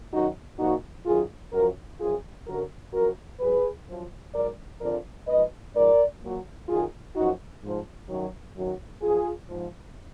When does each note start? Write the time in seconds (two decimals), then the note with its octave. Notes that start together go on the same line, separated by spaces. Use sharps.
0.12 F#2 D#3 F#3 D#4 F#4
0.58 A#2 F3 D#4 F#4
1.05 F#2 D#3 F#3 F4 G#4
1.52 F#2 F3 F#4 A#4
1.99 F#2 F3 F4 G#4
2.46 F#2 D3 F#3 F#4 A#4
2.93 F#2 F3 F#4 A#4
3.39 G#2 F#3 G#4 B4
3.87 F#2 F3
4.34 G#2 F#3 A#4 D5
4.80 F2 D3 F3 A#4 D5
5.27 G#2 F3 B4 D#5
5.74 G#2 F3 A#4 D5
6.21 A#2 F#3
6.67 F#2 D#3 F#3 F4 G#4
7.15 F#2 F3 D#4 F#4
7.62 G#2 F3
8.09 F#2 D#3 F#3
8.55 F#2 D#3 F#3
9.02 F#2 F3 F4 G#4
9.49 G#2 F3